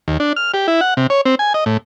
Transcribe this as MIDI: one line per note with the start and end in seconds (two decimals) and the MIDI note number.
0.08 0.18 39
0.20 0.33 62
0.36 0.52 89
0.54 0.67 67
0.68 0.81 64
0.81 0.94 78
0.97 1.07 48
1.10 1.21 73
1.26 1.35 60
1.39 1.53 80
1.54 1.64 75
1.66 1.77 45